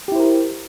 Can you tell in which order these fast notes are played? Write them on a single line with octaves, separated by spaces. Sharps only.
G4 E4 C5 A#4